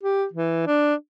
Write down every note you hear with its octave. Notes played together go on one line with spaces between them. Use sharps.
G4
E3
D4